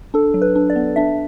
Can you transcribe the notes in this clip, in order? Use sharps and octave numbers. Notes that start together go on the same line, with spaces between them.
D4 A4
F#3
B4
D4
D5
B3
D4 E5